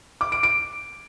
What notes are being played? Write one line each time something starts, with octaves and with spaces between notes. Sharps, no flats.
D6
D7
D7